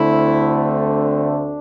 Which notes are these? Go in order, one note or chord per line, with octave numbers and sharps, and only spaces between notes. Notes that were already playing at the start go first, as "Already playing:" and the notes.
Already playing: D2 D3 A3 C4 E4
D4